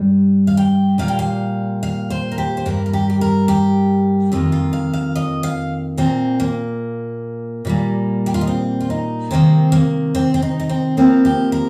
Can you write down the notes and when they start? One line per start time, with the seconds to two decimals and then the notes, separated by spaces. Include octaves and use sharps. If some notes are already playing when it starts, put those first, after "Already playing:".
Already playing: G2 G3
0.47 F5
0.57 G5
0.98 A#2 G3 A#3 F5
1.08 G5
1.19 F5
1.83 F5
2.10 C5
2.32 A#4
2.38 G4
2.57 C5
2.65 G2 G3 A#3 A#4
2.86 A#4
2.93 G4
3.10 G4
3.21 A#4
3.48 G4
4.32 F2 D#3 G3 A#3 F4
4.52 F4
4.73 F5
4.94 F5
5.16 D#5
5.43 F5
5.98 A#2 A#3 C4
6.40 A#3
7.65 A#2 G3 A#3
8.26 G4
8.34 F4
8.41 D#4
8.47 C4
8.81 F4
8.90 D#4
9.31 C3 D#3 G3 A#3 C4
9.72 A#3
10.15 C4
10.34 C4
10.42 D#4
10.60 D#4
10.69 C4
10.97 C3 F3 A#3 C4
11.25 G4
11.52 A#4